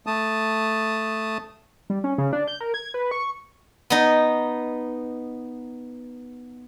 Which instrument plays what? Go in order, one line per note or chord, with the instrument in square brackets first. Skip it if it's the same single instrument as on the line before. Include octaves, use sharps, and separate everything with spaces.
[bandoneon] A3 A5 D#6
[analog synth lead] G3
C#4
C#3
D4
G6
A#4
G#6
B4
C#6
[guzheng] B3 D#4